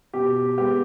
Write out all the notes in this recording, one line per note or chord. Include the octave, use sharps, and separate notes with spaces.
B2 G4
G#3 B3 G4